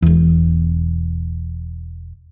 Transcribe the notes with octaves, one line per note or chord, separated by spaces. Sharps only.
E1 E2